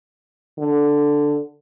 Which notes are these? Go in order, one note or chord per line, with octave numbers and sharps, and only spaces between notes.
D3